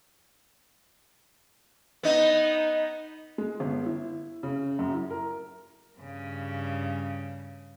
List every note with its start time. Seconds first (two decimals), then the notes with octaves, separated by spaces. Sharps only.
2.03 B3 D#4
3.38 G#3
3.60 G1
3.86 E4
4.43 C#3
4.79 F#2
4.94 E4
5.10 A#4
5.98 G2 C#3